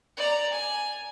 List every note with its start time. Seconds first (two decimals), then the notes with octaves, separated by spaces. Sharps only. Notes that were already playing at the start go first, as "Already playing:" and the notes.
0.17 D5 A#5
0.52 G#5